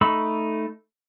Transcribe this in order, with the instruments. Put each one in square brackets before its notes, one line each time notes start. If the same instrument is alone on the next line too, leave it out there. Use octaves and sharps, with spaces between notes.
[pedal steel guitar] A3 D#4 B5 C#6 E6